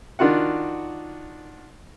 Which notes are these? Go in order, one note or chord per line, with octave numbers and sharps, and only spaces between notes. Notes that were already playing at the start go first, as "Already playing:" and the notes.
D#3 D4 F4 F#4 F#5